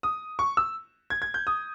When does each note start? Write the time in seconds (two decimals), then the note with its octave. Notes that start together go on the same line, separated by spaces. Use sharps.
0.03 D#6
0.39 C#6
0.57 E6
1.10 G#6
1.22 G#6
1.34 G6
1.47 D#6